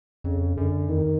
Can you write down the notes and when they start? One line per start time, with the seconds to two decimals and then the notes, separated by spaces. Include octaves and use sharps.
0.24 F2 C#3
0.57 F#2 D3
0.89 F2 D#3